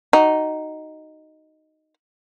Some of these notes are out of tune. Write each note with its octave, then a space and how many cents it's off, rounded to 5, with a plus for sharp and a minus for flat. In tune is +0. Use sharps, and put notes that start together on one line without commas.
D#4 +0 F#4 +25